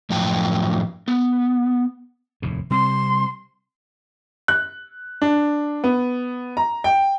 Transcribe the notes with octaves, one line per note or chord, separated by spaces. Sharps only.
F#2 A2 F3 G5 A5
B3
F1 D#2 A2
C3 G3 C4 C6
F#6
D4
B3
A#5
G5